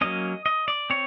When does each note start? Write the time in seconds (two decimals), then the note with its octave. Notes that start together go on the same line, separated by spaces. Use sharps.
0.01 F#3 A#3 C#4 D#5
0.46 D#5
0.68 D5
0.90 C4 C#5